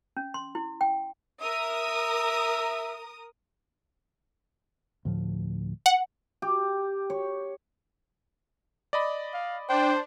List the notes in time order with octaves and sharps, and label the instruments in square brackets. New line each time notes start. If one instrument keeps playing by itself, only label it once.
[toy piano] C#4
C6
E4
G5
[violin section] A#4 D#6 [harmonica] E5 E6
[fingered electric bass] D2 A2 F3
[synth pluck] F#5
[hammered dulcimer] G4
C#5
[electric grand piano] D5 D#5 B5
[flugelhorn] F5
[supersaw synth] D4 [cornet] C5 [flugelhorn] G5